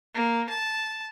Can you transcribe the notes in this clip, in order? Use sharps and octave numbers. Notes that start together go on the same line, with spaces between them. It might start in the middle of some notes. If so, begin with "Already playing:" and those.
A#3
A5